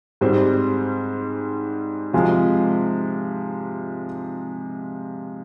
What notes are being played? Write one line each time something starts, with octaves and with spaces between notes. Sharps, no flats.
G#2 G3 C4
C3 F3 G#3